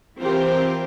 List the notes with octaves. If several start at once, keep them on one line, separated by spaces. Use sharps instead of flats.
E3 C4 F4 G4 A#4 C5